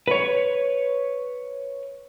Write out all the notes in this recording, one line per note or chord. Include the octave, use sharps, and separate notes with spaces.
B4 C#5